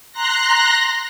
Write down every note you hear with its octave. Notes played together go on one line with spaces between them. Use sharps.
A#5 C6 F#6 A#6